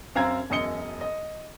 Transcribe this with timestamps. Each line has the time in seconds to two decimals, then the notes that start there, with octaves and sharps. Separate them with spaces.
0.15 F#2 C4 F5 A#5 E6 G#6
0.50 E1 F#2 D#5 D#6 C#7 G7
1.01 D#5